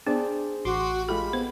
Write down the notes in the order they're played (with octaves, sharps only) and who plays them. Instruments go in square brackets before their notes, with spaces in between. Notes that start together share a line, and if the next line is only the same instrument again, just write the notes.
[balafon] B3 [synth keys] D4 D5 [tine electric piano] G#4 C5
[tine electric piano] A1 [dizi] F#4 [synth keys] C6 D6
[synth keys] G#3 F4 G4 [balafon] A4 [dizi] B5
[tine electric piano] B3 [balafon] C5